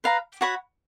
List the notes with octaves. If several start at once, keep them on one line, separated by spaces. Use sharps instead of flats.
B4 F5 A#5
F#4 C#5 F#5 B5